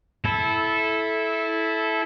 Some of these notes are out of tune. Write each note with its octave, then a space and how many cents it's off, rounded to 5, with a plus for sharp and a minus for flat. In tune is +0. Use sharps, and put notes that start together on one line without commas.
E4 -5 A4 -15